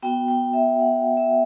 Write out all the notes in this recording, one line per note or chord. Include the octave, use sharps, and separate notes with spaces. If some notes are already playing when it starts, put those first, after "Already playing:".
B3 F#4 G5
G5
E5
F#5
E5